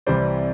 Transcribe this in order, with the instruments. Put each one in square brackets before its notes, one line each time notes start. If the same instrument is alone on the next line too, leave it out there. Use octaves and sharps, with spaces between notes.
[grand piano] C2 C3 E3 G3 C5 D5